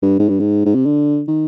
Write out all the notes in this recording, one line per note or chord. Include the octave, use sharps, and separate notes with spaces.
G2
G#2
G2
G#2
G#2
C3
D3
D#3